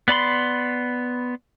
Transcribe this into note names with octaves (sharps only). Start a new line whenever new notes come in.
B3 D5 B5 C6